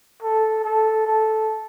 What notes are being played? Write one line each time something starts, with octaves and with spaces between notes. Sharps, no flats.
A4
A4
A4